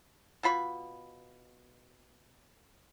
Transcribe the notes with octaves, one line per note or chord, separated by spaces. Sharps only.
B2 F4 B5 C#6